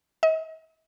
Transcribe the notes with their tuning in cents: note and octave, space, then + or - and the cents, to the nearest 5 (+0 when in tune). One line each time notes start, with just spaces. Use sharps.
D#5 +45